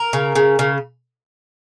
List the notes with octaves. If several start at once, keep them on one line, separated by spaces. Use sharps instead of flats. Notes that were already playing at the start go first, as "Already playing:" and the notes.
Already playing: A#4
C#3
C#3
C#3